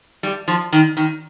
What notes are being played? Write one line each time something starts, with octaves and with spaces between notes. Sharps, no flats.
G3
F3
D#3
D#3